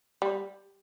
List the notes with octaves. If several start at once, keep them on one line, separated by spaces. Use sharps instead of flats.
G3